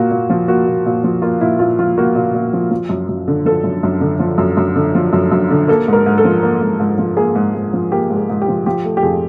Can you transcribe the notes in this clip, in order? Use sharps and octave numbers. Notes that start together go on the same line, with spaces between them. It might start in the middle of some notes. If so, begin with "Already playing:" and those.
Already playing: A#2 A#3 F#4
A#2
F3
A#3 F#4
A#2
A#2
F3
A#3 F4
A#2 E4
A#2 F4
F3 F4
A#3 F#4
A#2
A#2
F3
F3
F#2
F#2
D3
F3 A4
F#2
F#2
D3
F3
F#2
F#2
D3
F3
F#2
F#2
D3
A#3 A4
G#2 A#4
G#2
A4
F3
A#3
G#2
G#2
F3
A#3 G#4
G#2
G#2
F3
A#3 G4
G#2
G#4
G#2
G4
F3
F3 G4
A3
G4
F2 G#4